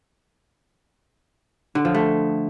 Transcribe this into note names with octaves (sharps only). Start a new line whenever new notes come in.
D3
F3
A3